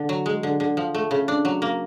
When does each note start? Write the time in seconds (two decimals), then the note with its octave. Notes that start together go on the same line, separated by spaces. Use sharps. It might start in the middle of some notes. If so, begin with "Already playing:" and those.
Already playing: D3
0.09 F#3
0.26 G#3
0.43 D3
0.60 D3
0.77 F3
0.95 A3
1.11 C#3
1.28 D4
1.45 F#3
1.62 A#3